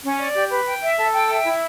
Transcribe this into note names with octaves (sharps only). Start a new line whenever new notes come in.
C#4
D5
G4
B4
G5
E5
A4
G5
E5
E4